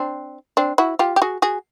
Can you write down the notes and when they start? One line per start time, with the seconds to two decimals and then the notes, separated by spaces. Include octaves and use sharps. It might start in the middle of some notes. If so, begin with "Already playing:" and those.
Already playing: C4 D4
0.57 C4 D4
0.78 E4 F#4
0.99 F4 G4
1.16 G4
1.22 F#4 G#4
1.42 F#4 G#4